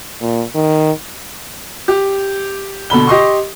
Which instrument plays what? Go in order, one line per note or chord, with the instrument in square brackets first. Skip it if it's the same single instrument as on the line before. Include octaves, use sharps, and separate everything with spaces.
[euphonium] A#2
D#3
[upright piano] G4
B2 D3 B5 G7
G4 D#5 C6 C#6